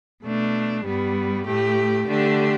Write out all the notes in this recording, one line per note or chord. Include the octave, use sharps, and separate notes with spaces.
B2 A3 D4
G2 G3 B3
A2 A3 G4
D3 A3 D4 G4